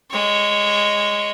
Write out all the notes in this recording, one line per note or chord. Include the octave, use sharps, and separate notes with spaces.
G#3 C#5